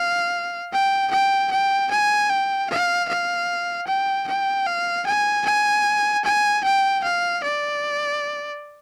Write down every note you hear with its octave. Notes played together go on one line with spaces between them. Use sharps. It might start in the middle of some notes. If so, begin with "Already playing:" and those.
Already playing: F5
G5
G5
G5
G#5
G5
F5
F5
G5
G5
F5
G#5
G#5
G#5
G5
F5
D5